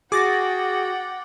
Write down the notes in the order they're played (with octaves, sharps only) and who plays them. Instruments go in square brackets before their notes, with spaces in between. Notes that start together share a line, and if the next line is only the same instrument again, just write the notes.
[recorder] F#4 [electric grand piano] G#4 [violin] F#5 G5 [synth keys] D6 A6 A#6